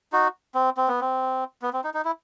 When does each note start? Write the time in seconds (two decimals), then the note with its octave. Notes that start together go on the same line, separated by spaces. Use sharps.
0.12 D#4 F#4
0.55 C4
0.77 C4
0.88 B3
1.01 C4
1.62 B3
1.73 C4
1.84 D#4
1.94 D#4
2.05 E4